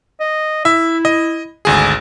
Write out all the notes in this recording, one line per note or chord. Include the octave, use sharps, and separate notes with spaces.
D#5
E4 E5
D#5
G#1 D2 G#4